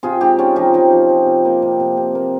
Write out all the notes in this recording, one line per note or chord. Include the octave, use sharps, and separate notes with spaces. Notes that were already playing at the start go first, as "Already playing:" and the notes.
C3 F4 G#4
G#3 D#4 G4
C3 C#4 F4
F3 D#4 G4
F3 D#4 G4
F3
F3
C3
A#3
C3
C3
C3
A#3